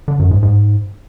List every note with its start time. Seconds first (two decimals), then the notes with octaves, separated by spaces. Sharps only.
0.08 D3
0.19 F#2
0.31 G#2
0.43 G#2